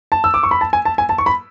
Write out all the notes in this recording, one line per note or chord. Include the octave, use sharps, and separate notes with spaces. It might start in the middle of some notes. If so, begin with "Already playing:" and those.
A5
E6
D6
C#6
B5
A5
G#5
A5
G#5
A5
C#6
B5